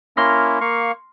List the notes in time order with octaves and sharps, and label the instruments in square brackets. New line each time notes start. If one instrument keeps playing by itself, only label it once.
[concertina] A#3 C#4 E4 [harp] C6 F6 A#6
[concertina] A#3 F5 C#6